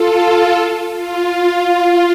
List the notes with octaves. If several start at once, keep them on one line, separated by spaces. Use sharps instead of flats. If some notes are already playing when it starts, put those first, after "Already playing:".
Already playing: F4 A4
F4 A4
F4